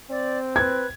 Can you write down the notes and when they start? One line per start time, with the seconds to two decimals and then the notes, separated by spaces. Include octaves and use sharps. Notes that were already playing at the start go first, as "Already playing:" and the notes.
0.10 C4 D5
0.56 B4 G#6